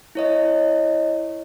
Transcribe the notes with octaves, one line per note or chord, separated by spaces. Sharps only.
E4 C#5 D#5